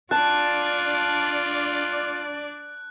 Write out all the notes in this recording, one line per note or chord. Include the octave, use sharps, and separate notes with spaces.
D4 F4 D5 A5 F#6